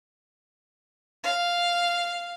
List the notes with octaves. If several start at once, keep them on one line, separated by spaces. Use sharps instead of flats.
F5